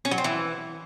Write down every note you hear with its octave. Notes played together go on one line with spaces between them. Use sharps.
C#4
F#3
C4
E3